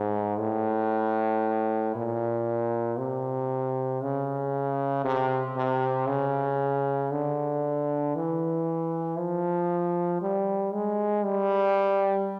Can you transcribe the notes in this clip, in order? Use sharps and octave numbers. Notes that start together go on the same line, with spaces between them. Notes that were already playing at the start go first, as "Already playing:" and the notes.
Already playing: G#2
A2
A#2
C3
C#3
C3
C3
C#3
D3
E3
F3
G3
G#3
G3